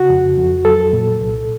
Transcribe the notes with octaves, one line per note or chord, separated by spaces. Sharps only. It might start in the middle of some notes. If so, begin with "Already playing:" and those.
Already playing: C#3 F#4
F2
F2
F#3 A4
A#2
C2